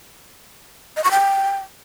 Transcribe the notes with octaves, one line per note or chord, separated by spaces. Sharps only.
D#5
C#6
G5